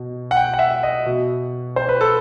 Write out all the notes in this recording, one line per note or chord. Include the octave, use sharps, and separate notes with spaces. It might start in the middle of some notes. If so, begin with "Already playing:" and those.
Already playing: B2
F#5
G5
F#5
E5
D#5
B2
C5
B4
A4